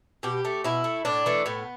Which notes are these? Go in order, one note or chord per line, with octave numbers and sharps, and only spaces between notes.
B2 G4
A3
B2 E4
A3
A2 D4
E3 A3
A2 B3